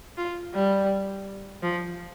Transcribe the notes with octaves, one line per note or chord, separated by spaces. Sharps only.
F4
G3
F3